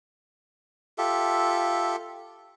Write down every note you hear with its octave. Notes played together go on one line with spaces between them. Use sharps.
F4 G4 A4 E5